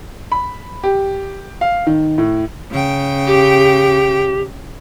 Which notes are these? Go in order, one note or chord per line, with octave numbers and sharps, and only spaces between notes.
B5
G4
F5
D#3
A2
C#3 G5
G4